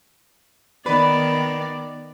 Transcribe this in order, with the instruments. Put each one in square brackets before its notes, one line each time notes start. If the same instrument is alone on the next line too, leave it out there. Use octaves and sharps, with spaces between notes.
[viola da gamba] D#3 B3 [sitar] B4 [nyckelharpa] D5